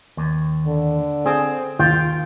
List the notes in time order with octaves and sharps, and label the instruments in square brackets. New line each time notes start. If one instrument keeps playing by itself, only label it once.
[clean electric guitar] D#2
[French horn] D3
[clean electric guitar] C4 [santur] G#4
[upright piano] D#2 [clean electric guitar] F4 [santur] G5